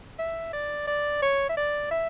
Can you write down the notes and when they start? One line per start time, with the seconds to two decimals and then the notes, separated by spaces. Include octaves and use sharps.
0.19 E5
0.53 D5
0.87 D5
1.22 C#5
1.49 E5
1.57 D5
1.91 E5